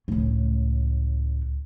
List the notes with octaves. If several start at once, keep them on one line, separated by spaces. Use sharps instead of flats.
C#2 A2